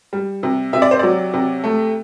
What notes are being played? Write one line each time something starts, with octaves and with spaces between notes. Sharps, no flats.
G3
C3
C3 E5
D5
C5
F#3 D5
C3
A3